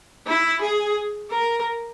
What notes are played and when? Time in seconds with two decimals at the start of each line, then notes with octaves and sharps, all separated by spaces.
0.27 E4
0.61 G#4
1.31 A#4